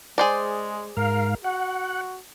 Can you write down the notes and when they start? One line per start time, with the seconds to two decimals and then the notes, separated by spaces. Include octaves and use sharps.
0.18 G#3 G#4 C5 D5
0.97 G#2 A#4 F5
1.44 F#4 F#5